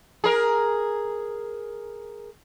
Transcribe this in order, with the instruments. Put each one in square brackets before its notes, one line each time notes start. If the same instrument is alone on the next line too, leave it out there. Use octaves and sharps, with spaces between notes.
[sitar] G#4 A#4